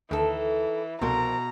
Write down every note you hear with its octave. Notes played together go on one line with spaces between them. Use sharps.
D2 D#3 E3 A4
C2 F2 B2 C4 A#4 A#5